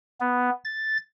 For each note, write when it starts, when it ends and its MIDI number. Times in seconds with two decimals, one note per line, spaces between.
0.20 0.50 59
0.65 0.97 93